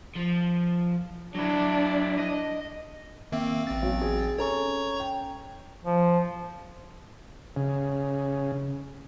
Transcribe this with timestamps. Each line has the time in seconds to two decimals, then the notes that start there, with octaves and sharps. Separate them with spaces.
0.15 F3
1.35 F#3 D4 E4
2.18 D#5
3.32 D#3 A#3 C4 E5
3.67 A1 C4 A6
3.82 B1
4.01 G#4
4.38 C#4 A4 C#5 A#5 C#6
5.00 G5
5.85 F3
7.56 C#3